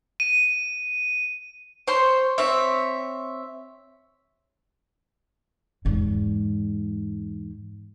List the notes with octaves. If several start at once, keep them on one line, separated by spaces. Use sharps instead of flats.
D#7
C5 C#5 C6
C4 C#5 E5
E2 G#2